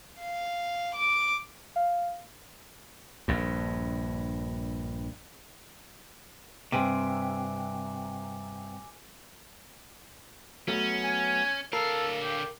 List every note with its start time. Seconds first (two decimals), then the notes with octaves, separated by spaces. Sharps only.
0.19 F5
0.95 D6
1.76 F5
3.28 A#1 G2
6.72 G2 C3 C4 G#5 D6
10.68 F#3 A3 B3 C#4
11.03 G#5
11.73 D3 A4 A#4 F5
12.22 G4